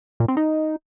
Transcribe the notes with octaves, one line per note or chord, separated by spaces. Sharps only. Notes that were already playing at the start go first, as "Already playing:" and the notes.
A#2
C4
D#4